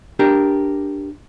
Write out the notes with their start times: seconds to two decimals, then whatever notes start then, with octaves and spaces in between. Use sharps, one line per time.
0.19 D4 G4 A#4